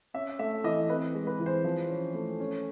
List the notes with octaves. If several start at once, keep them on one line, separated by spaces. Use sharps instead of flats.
C#4 E5
A3 E5
E3 D#5
C4 B4
G#3
B4
E3
C5
F3
C#4
A3
C#4